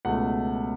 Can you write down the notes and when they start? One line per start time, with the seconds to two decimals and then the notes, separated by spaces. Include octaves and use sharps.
0.05 C#2 B2 A3 F#5